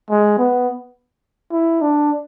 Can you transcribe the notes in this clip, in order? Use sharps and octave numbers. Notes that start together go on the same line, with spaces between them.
G#3
B3
E4
D4